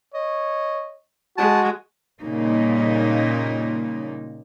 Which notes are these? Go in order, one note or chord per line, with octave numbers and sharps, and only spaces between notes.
C#5 D#5
G#3 F#4 A5
A#2 C#3 G3 A#3 D#4